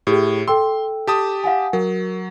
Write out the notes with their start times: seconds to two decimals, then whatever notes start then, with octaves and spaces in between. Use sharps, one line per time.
0.07 A2 G4 G#4
0.48 A4 G5 C6 E6
1.07 G4 A5 D#6
1.44 F5 F#5 G#5
1.73 F#3 A#4